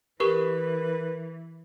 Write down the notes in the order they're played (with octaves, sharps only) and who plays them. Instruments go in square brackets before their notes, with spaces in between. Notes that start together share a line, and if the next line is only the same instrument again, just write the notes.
[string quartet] E3 [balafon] G4 C#6 [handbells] A#4 [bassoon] B4